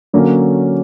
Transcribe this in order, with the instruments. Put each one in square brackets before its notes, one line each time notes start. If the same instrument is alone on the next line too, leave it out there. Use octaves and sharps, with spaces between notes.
[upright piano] D3 F#3 A#3 C#4